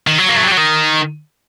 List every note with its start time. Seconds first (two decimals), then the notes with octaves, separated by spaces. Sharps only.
0.07 D#3
0.19 F#3
0.29 A#3
0.36 A3
0.44 G3
0.51 F#3
0.57 D#3